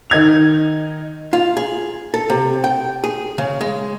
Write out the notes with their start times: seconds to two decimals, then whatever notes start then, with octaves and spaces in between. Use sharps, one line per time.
0.10 D#3 D#4 G#6 F7
1.33 F4
1.57 G#4
2.14 A4
2.30 C3
2.64 G5
3.04 G#4
3.38 C#3
3.61 G#3